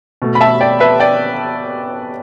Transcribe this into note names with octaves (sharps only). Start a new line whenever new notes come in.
B2 A3
B5
E5 A5
D5 G5
B4 E5
D5 G5